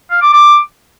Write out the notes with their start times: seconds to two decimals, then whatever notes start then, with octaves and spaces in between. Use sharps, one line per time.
0.11 F5
0.22 D6
0.33 D6